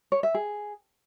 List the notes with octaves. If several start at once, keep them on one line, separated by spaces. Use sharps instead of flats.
C#5
E5
G#4